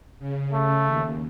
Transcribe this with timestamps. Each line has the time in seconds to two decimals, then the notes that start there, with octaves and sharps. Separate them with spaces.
0.19 C#3
0.53 A3
0.87 D#2